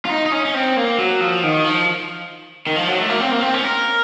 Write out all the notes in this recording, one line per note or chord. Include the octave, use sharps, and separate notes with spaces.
F4
D#4
D#4
C#4
C#4
C4
A#3
F#3
F3
D#3
F3
D#3
F3
F#3
A3
A#3
C4
A#3
C4
C#4
A#4